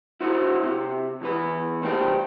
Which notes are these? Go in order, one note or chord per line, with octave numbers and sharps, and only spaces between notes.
E4 F#4 C5
C3
E2 E3 B4
C2 G3 A#3 C5 G5